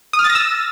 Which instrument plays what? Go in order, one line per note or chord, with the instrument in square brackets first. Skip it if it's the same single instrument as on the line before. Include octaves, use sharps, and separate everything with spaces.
[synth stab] D#6
F6
A6
A#6
E6